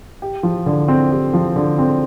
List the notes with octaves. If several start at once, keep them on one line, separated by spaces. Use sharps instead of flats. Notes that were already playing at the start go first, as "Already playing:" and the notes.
G4
F3
D3
C4
G4
F3
D3
C4